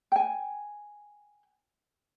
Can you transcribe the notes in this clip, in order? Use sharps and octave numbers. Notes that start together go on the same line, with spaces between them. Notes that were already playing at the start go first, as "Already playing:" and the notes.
G5 G#5